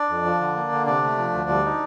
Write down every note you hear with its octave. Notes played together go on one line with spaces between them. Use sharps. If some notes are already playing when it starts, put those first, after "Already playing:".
Already playing: D4 D5
F2
F3
D3
A#3
D3
C3 D4 D5
A3
F3
D2
G3
D#4